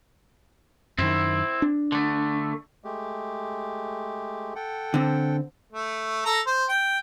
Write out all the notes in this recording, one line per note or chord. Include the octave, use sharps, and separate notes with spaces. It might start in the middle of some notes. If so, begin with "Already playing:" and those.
F#2 D#3 C4 E4
D4
D3 A3
G#3 A3 G4
A4 F#5 G5
D3 C4
A3
A4 A#5
C5
G5